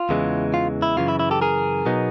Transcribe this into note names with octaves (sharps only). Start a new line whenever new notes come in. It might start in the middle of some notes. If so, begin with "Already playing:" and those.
Already playing: F4
E2 C#3 E3 G#3
F4
E4
F#2 C#3 E3 F4
E4
E4
G4 A4
G#4 A#4
B2 F#3 B3 D#4